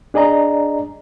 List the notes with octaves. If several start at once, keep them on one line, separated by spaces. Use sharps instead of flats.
D4 G#4 D5 D#5 A#5